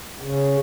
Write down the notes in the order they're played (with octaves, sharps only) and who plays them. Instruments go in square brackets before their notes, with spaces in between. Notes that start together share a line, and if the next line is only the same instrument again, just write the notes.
[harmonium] C#3